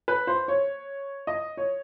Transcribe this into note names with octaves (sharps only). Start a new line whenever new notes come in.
B4
C5
C#5
D#5
C#5